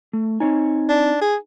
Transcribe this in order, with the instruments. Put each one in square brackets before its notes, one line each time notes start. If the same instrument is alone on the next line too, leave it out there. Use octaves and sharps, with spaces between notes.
[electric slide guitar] A3
[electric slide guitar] C4 C#5 G#5 [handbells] D#4
[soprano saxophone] D4
G#4